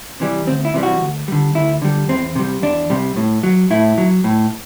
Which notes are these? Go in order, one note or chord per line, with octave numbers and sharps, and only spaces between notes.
C3 E3 G3
D2 C4
E4
C3 E3 G3
F#4
D2
D3 G3
D2 E4
D3 G3
E2 C4
C3 G3
E2 D4
C3 G3
A2
F#3
A2 E4
F#3
A2